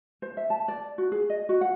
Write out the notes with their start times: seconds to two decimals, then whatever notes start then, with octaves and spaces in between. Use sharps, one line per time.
0.22 C5
0.37 E5
0.50 A5
0.68 D5
0.98 F#4
1.12 G#4
1.30 D#5
1.49 F#4
1.61 F#5